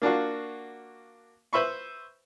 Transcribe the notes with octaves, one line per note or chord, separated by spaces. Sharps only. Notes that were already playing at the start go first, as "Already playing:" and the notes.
A#3 D4 F4 F#4
B4 C5 E5 B5 C#6